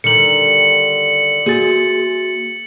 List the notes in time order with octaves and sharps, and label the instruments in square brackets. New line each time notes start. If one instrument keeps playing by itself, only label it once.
[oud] D3 D#3 G3 [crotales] C#7 F#7
[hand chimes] A#3 F#4 A6 [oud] G#4